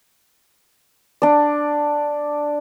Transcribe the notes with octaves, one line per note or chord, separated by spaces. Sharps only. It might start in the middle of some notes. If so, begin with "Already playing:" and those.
D4 D5